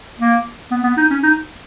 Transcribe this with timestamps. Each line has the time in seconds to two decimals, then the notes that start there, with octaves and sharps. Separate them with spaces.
0.19 A#3
0.71 B3
0.84 B3
0.97 D#4
1.10 C#4
1.23 D#4